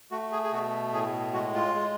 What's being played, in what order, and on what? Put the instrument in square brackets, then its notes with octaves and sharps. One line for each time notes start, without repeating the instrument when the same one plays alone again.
[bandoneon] A3 F#4
G#4
G#4
B2 F#4
A2 G#4
G#3 F#4
F4
G#3